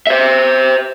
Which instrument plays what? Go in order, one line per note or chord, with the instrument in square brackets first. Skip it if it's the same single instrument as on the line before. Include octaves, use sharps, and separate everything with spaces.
[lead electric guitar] C5 E5